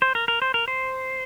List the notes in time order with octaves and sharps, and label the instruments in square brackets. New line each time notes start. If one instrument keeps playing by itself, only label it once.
[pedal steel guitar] C5
A#4
A#4
C5
A#4
C5